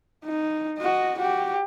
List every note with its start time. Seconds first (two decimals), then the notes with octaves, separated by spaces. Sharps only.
0.25 D#4
0.79 F#4 D#5
1.18 F#4 G4